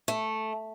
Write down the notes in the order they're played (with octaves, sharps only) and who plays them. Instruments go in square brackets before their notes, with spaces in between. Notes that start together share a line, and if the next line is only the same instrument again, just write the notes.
[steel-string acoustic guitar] A3